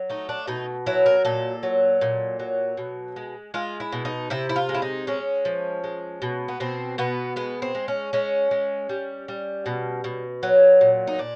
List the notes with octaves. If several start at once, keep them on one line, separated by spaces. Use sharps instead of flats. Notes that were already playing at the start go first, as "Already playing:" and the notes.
Already playing: F#3
A3 D#4
D4
B2 D#4
F#3 E4
A#4
A#2 A4
F#3
A#2
F#3
B2
G#3
G#3 F4
E4
B2
D#4
C3 E4
E4
F4
G#3
E4
D#4
G#3 C#4
F3
G#3
B2
B3
B2 C4
B2 B3
G#3 B3
C4
G#3
C#4
G#3 C#4
G#3
G3
G3
B2
B2
F#3
A#2
D#4
A#2 D4